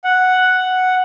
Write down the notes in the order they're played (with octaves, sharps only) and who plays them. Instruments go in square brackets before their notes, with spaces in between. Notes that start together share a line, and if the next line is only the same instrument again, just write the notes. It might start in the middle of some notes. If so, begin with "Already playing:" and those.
[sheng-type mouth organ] F#5